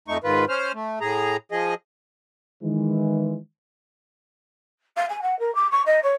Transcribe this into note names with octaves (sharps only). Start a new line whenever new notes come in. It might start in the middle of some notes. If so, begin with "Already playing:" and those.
F2 A3 D#4 C#6
G#2 D#3 F4 B4
C#4 C5 F6
A3
A2 G#4 A#5
F3 G#4 D#5
D#3 E3 G#3
F5
G#5
F#5
A#4
D6
C#6
D#5
C#5